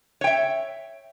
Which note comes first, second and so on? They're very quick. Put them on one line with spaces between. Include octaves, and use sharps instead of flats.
C#5 G5 E5